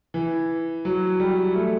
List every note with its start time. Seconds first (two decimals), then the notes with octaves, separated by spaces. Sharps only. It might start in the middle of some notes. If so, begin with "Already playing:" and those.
0.14 E3
0.85 F#3
1.20 G3
1.55 A3